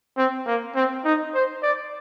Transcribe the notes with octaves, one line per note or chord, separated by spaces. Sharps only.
C4
A#3
C4
D#4
C5
D5